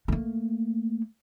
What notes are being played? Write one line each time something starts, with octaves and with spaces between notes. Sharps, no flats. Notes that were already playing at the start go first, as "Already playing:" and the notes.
A3 A#3